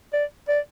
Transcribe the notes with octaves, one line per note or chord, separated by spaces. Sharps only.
D5
D5